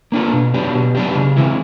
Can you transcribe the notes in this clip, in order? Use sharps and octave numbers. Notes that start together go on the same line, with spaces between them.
A#3 D4 F4 A4
B2
F#3 B3 D4 G4
B2
F#3 B3 D4 G4
C#3
E3 G#3 C4 E4